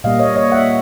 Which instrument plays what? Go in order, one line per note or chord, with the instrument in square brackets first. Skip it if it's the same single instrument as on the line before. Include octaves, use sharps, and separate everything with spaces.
[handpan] A#2 G3 A#3 D#5 F5
C#5 D#5
C#5 D#5
E5 F#5